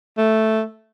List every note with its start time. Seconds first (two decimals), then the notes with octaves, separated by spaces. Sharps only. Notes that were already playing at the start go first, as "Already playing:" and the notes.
0.18 A3